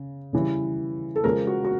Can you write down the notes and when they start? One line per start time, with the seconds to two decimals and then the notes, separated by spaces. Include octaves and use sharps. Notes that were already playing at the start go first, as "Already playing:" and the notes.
Already playing: C#3
0.33 C#3 E3 G3
1.16 A4
1.24 C#3 F3 G#3 A#4
1.47 F#4
1.65 F#4